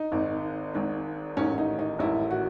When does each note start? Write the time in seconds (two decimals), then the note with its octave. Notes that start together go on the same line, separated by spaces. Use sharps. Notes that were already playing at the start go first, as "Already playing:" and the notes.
Already playing: D#4
0.12 G#1 G#2 D#3
0.74 G#1 G#2 D#3
1.37 A1 G#2 D#3 C#4
1.58 D#4
1.79 D#4
1.99 A1 G#2 D#3 E4
2.30 F#4